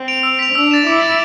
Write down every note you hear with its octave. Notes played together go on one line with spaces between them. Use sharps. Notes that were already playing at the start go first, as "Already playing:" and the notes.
Already playing: C4
D7 F7
E6
B6 F7
D4 E6
A6 E7
E4 D6
A6 D7